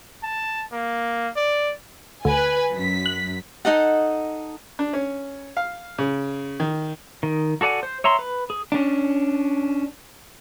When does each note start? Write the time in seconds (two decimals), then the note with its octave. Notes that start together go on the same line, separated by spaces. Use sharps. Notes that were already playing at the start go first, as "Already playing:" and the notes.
0.23 A5
0.72 A#3
1.36 D5
2.25 D2 B4 G#5
2.73 F#2 B6
3.06 F#6
3.65 D#4 A4 D#5 F#5
4.79 D4
4.93 C#4
5.57 F5
5.99 C#3
6.60 D#3
7.23 D#3
7.61 F#4 A4 D5 F#5 G#5
7.83 C5
8.04 C#5 E5 A#5 C6
8.19 B4
8.50 G#4
8.72 C#4 D4